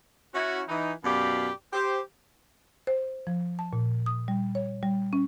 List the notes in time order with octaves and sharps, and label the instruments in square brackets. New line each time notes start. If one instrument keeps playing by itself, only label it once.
[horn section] C#4 E4 F#4
E3 D#4
F#2 B2 G4 D5 F5 B5
G4 C5
[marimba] C5
F3
A5
A#2
D#6
G3
C#5
G3
C#4